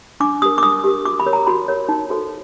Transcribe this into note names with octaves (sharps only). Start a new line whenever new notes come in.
D4 D6
G4 A#4 D#6
D6
D4 D#6
G4 A#4
F#4 D6
B5
A#4 C#5
A#5
F#4 B5
A#4 C#5
D#4
F#4 A4 C5